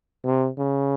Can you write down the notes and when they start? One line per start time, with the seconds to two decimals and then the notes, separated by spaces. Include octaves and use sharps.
0.25 C3
0.58 C#3